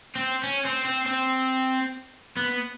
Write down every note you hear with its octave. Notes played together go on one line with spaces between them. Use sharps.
C4
C#4
C4
C4
C4
B3